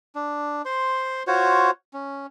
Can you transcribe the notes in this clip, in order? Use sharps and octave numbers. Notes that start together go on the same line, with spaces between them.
D4
C5 C6
F4 F#4 C5 C#5
C#4